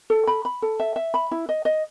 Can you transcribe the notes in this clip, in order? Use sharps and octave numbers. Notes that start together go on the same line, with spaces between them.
A4
B5
B5
A4
E5
E5
B5
E4
D#5
D#5